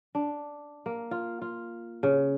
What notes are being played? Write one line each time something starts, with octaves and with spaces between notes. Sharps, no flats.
D4
A#3
F4
F4
C#3